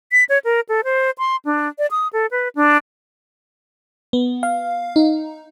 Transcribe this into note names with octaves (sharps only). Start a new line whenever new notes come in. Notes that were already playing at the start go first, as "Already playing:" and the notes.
B6
C#5
A#4
A4
C5
C6
D4
D5
D#6
A4
B4
D4
B3
F5
D#4